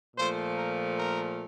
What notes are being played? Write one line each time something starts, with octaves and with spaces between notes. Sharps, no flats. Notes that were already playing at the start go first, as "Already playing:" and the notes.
A#2 F3 A3 C5
A#4
A#4